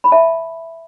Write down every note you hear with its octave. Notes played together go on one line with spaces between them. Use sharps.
B5
E5 A5